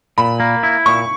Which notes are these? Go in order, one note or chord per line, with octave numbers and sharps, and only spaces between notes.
A#2 B5
A#3
E4
A#2 C#6